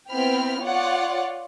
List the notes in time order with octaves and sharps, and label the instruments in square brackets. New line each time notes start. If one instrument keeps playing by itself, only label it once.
[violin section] B3 C4 E4 G5 B5 F6
F4 C#5 D5 F#5